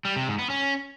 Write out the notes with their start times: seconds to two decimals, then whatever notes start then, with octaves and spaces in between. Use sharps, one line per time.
0.05 G3
0.16 C3
0.27 G#2
0.39 B3
0.50 C#4